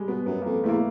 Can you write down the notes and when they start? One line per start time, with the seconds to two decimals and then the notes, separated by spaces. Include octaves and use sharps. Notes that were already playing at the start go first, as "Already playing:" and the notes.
Already playing: G3 G#3
0.08 B2 B3
0.26 F#2 B3
0.41 F2 A#3
0.64 E2 A3 A#3